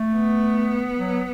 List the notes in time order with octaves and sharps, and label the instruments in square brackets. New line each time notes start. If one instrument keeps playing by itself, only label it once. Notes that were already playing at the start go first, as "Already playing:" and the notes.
Already playing: [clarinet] A3
[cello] B3
[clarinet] F#3